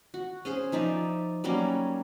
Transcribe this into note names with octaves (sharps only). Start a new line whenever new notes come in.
F#4
C#4 G#4 C5
F3 D#4 D5 E5
F#3 G3 A#3 C#4